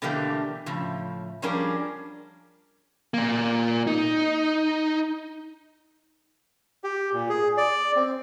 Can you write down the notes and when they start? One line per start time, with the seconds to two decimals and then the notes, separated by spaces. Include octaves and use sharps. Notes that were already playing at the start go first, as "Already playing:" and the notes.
0.02 B2 D3 E3 A3 A#3 G4
0.66 A2 C#3 F3
1.42 F3 G3 C#4 D4 G#4 A#4
3.14 A#2 A#3
3.87 D#4
6.84 G4
7.13 A#2
7.30 G#4
7.57 D5
7.96 C4